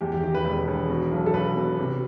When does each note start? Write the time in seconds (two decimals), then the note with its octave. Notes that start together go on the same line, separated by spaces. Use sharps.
0.01 E2 G4
0.12 G4
0.23 D#3 G4
0.35 B4
0.45 E1 B4
0.68 E1
0.89 B2
1.12 B1
1.26 A4
1.33 B1 B4
1.56 B2
1.79 C3